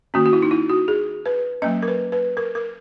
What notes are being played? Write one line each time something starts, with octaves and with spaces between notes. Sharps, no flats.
D#3 A#3 C#4 F#4
F#4
E4
D#4
E4
F#4
G#4
B4
F#3 A#3 C#4 D#5
A#4
B4
B4
A#4
A#4